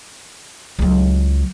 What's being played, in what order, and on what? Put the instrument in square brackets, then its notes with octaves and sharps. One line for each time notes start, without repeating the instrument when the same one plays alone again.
[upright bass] C#2 F#3